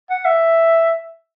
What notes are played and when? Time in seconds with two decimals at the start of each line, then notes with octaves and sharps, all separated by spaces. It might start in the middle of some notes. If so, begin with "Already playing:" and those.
0.10 F#5
0.25 E5